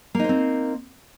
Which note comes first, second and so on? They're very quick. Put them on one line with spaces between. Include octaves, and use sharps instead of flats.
A#3 D#4 C5 C4